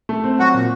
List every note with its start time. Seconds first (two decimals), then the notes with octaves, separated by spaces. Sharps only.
0.09 A3
0.24 C4
0.39 F#3 F#4
0.54 A#2